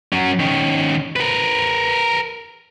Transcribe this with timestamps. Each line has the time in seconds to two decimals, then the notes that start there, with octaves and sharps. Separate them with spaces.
0.13 F#3 C#4
0.39 D#3 C#4
1.16 A#4 B4